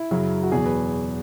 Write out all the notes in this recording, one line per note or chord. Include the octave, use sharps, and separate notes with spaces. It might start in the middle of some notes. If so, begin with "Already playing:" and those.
Already playing: E4
F#2 C#3 F#3
F#4
E2 B2 F#3 G#4
B4